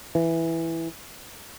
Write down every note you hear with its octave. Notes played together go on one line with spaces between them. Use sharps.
E3